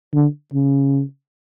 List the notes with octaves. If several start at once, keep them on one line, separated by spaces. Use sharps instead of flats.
D3
C#3